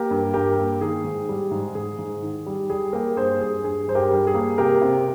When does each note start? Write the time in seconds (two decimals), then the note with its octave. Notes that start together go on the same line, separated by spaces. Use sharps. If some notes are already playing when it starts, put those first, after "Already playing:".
Already playing: A#3 G4 A#4
0.11 G2
0.34 G2 G4 A#4
0.58 A#3
0.81 D#3 G#4
1.04 G#2
1.29 G3
1.51 G#2
1.75 G#2 G#4
1.99 G#2
2.22 D#3
2.46 G3
2.70 G3 G#4
2.93 A#3 G4 A#4
3.16 G2 G#4 C5
3.40 G2 G#4
3.64 G2 G#4
3.88 G2 C5
3.95 G4 A#4
4.11 G3
4.27 G#4
4.34 A#3
4.58 C3 G4 A#4
4.82 C3